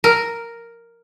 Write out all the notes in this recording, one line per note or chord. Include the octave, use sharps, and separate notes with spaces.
A#4